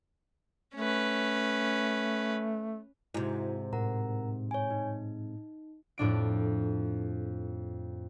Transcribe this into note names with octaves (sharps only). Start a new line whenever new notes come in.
A3 C#4 B4
G#2 C3 E4 F#4
A2 A#4 F#5 A#5
C#5 G#5
D#4
F2 A2 D4 D7